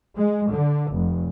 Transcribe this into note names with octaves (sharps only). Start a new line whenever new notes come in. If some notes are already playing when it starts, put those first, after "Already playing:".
G#3
D3
F1